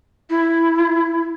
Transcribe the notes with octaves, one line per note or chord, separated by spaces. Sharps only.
E4